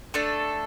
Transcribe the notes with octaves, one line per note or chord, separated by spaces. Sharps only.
A3 D4 A4